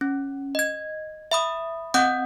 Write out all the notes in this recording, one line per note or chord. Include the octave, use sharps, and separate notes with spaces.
C#4
D#5 G#6
E5 B5 D#6
C4 D#5 F#5 D#6 G6